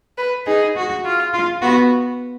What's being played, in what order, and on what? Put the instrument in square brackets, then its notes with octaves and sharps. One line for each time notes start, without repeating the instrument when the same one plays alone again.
[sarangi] B4
[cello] D#4 [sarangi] G#4
[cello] F#4
[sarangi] F4
[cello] F4
[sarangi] B3 [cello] F#4